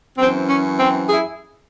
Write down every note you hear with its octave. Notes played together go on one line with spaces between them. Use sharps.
F#2 E3 C4
C#4
C4
E4 G#4